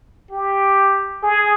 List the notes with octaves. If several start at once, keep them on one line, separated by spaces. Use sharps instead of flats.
G4
G#4